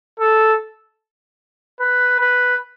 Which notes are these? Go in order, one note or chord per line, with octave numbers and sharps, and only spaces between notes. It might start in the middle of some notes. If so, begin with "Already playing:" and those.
A4
B4
B4